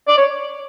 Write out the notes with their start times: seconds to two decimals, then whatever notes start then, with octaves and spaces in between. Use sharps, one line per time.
0.08 D5
0.17 C#5